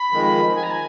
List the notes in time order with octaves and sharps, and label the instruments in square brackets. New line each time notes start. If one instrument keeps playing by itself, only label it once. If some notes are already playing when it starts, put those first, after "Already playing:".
Already playing: [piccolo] B5
[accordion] F2 D#3 G#3
[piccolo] G#5
A#5
G#5